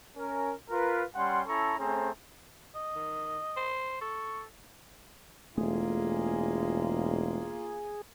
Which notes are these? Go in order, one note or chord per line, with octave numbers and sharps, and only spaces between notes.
C#4 A#4
F4 A#4 B4
G3 C#4 F#5 G5 C6
C#4 E4 A4 A5 A#5 C#6
A3 C4 C#4 G#4 C5 A#5
D#5
D#3
C5
A4 C#6
E1 A3 A#3 F4 G#4